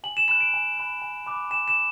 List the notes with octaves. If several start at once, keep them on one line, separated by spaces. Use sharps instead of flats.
G#5 F#7
E7
B5 F#6 E7
D7
G#5
B5 F#6
G#5
B5 D6 F#6
G#5 E7
E7
B5